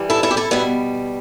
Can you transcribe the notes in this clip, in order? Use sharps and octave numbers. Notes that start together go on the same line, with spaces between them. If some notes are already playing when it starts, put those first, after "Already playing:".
Already playing: G2 E3 G3
E4 A4
E4 A4
G4
E4 A4
B2 G3 B3 E4